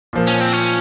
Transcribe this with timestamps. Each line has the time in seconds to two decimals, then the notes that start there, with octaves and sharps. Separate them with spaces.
0.13 A#2 F3 A#3
0.27 C#4
0.40 C4
0.53 C#4